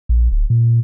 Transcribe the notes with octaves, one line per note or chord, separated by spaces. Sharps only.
A#1
D1
A#2